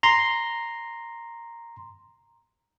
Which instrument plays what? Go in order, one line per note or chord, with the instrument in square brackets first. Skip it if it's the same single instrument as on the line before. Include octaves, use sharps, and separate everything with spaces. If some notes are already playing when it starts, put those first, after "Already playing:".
[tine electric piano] A#5 C6